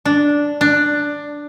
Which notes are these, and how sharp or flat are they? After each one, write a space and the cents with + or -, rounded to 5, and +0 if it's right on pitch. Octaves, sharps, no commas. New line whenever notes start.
D4 -5
D4 +10